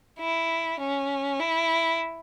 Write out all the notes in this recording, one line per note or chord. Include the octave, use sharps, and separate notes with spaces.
E4
C#4
E4